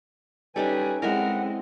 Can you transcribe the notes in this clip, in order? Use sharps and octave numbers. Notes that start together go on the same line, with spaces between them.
G3 C#4 D#4 A4 B4 G#5
G#3 C4 E4 A#4 D#5 E5 F#5